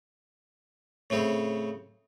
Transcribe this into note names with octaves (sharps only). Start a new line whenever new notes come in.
A2 C#3 C4